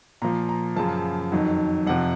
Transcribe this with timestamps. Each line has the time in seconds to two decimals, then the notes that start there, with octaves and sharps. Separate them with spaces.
0.22 A#2 F3 A#5
0.49 A#5
0.76 F#2 C#3 F3 A5
1.32 F2 D#3 F#3
1.87 F2 C3 F3 F#5